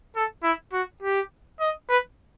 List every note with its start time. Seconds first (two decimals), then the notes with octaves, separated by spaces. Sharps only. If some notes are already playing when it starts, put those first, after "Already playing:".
0.15 A4
0.43 E4
0.73 F#4
1.03 G4
1.60 D#5
1.89 B4